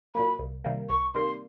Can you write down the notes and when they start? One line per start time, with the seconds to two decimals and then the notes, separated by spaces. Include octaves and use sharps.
0.15 A#2 F#3 A#3 B5
0.39 C2
0.64 C3 D#3 G3 A#3
0.89 C2 C#6
1.14 C3 D#3 G3 A#3 C6